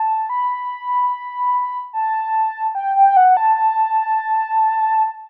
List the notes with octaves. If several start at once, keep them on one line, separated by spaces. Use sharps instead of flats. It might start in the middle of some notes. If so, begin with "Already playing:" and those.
Already playing: A5
B5
A5
G5
G5
F#5
A5